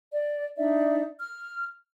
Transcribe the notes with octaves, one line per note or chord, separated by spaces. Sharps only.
D5
D4 D#4 D5 E5
F6